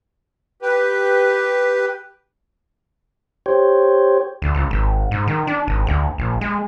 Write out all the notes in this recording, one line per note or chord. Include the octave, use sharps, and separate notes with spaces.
G4 B4
G4 C5 C#5
D2
C#2
G#1
G#2
D#3
D4
G#1
D2
A#1
G#3